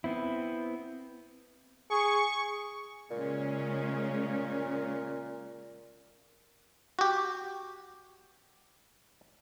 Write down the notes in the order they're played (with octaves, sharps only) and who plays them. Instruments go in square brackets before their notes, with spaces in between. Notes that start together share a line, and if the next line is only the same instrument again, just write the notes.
[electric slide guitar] B3 C4 E4
[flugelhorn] G#4 [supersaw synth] C#6
[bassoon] A#2 [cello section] C#3 G#3 C#4
[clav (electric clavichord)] F#4 G4